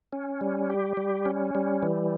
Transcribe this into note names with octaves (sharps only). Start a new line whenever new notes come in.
C#4
G3
G4
G3
C#4
G3
E3